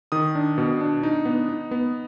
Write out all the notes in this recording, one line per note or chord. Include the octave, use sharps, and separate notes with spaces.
D#3 D#6
D4
B2
D4
D#4
B3
D#4
B3